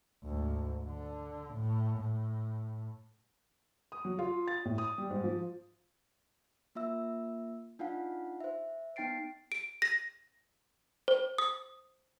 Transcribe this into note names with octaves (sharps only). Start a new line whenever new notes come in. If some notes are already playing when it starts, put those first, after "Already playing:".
D2 G#2
D3
A2
A2
D#6
F#3
F4
A6
A2
D#6
G3
G#2
F3
A#3 F4 E5 E6
D4 D#4 F4 F5 F#5
C5 E5
B3 D#4 G5 A6 C7 D7
D7
A#6
C5
D#6